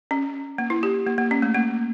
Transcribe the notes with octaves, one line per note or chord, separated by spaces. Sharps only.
C#4
A#3
E4
G4
A#3
A#3
C#4
A3
A#3